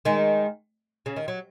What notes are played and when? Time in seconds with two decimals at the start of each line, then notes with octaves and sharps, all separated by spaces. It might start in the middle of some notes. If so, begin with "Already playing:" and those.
0.05 D#3 G#3
1.06 C#3
1.16 D#3
1.28 F#3